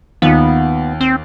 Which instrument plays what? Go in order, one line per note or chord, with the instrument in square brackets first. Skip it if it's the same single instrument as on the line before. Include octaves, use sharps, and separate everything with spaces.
[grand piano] D#2 D#4 F4 [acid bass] B3
[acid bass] C4